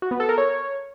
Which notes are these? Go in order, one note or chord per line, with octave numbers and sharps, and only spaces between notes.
F#4
B3
A4
A#4
C#5